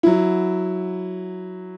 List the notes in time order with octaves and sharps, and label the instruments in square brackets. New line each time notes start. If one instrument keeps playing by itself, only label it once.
[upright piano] F#3 E4